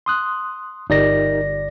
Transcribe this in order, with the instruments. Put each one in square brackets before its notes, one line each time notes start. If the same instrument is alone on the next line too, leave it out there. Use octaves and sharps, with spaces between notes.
[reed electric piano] C6 D#6 F#6
[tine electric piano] G1 D5 A#6 [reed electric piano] D#4 G4 A#4